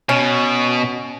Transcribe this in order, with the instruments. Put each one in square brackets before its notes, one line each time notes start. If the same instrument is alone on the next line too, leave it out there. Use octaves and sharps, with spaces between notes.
[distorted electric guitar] B2 [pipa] C#4